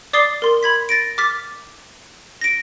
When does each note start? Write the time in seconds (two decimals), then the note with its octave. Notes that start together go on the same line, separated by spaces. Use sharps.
0.13 D5 D6 D#6 A6 C7 G7
0.42 A#4 C6
0.63 B5 G#6 B6
0.89 A6 A#6 D7
1.18 D6 F6 A6 B6
2.41 A#6 D7